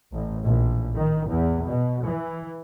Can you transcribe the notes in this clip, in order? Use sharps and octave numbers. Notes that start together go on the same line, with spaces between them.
A1
A#1
D#3
E2
B2
E3